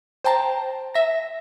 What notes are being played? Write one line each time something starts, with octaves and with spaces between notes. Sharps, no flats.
C5 G5 A5 A#5
E5 A#6